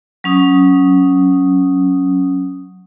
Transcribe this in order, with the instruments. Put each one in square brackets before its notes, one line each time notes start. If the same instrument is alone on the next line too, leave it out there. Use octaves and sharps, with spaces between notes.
[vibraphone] F#3 C#4 D#6